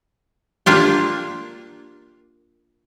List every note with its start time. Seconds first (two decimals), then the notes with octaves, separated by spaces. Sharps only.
0.66 A#3 D4 F4 G4